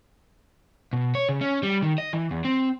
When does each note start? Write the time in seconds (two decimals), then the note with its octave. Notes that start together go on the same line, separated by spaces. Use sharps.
0.93 B2
1.15 C#5
1.29 C#3
1.41 C#4
1.63 G3
1.83 D#3
1.98 D#5
2.13 E3
2.31 E2
2.45 C4